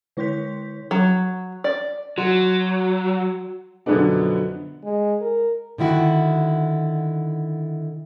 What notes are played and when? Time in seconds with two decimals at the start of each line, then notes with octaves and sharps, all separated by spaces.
0.17 D3 E4 C#5 C6 G6 B6
0.91 F#3
1.64 D5
2.18 F#3 F#4
3.86 F#2 B2 D3 F3 B3 D4
4.84 G#3
5.21 A#4
5.78 D3 D#3 E4 F#4